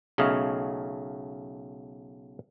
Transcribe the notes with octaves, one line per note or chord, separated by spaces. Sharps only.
B1 C#3 A3 C#5 D#5 F5